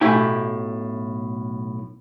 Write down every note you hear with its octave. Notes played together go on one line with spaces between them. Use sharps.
B1 A2 E4 G4 G#5